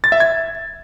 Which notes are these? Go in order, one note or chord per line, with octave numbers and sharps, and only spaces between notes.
A6
E5
G#6